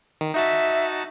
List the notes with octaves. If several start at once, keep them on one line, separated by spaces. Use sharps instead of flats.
D#3
D#4 F#4 E5 A5